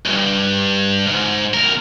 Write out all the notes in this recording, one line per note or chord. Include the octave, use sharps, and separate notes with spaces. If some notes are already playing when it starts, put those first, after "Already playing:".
B1 G2
G#2
B1 A#4